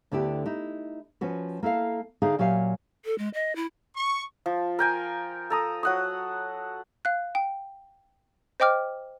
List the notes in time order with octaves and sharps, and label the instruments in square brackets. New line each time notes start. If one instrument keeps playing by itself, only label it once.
[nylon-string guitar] D2 D3 B3 E4 G4
D#4 E4
F3 C#4 F#4 B4
A#3 E4 A4 F5
D3 D#4 G#4 E5 F5
A#2 F#3 G4 E5 F5 G#5
[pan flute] A4
G#3
D#5
E4
[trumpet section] C#6
[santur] F3
A#4 G5 G#5
A4 A#5 D#6
F#3 F#5 D#6
[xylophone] F5 F#6
G5
C5 D#5 G5 D6 F6